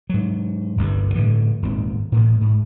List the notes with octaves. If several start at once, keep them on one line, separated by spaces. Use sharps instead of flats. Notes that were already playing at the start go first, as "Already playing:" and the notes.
G#2 F#3
G1 C2 G2
A2 D3 E3
D#1 G#1 G#2 C4
A1 A2
G#2